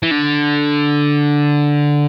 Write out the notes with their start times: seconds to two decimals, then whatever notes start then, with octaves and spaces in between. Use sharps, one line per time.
0.03 E3
0.11 D3